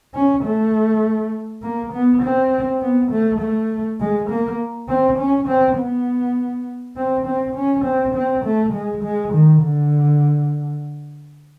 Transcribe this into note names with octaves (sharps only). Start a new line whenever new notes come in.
C#4
A3
A#3
B3
C4
B3
A3
A3
G#3
A#3
C4
C#4
C4
B3
C4
C4
C#4
C4
C4
A3
G#3
G#3
D#3
D3